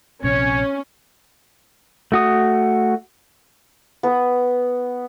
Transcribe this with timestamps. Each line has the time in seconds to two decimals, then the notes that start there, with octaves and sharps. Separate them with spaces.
0.24 A#1 C3 C#4 C#5
2.12 A3 F#4 D#6
4.03 B3